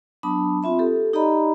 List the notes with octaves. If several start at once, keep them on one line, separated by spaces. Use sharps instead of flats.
F#3 B3 D4 A5 B5 D#6
C4 F4 E5 B5
G4 A4
D#4 G4 D5 D#5 A#5 B5